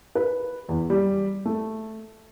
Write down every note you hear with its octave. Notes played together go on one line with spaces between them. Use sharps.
B4
E2
G3
A3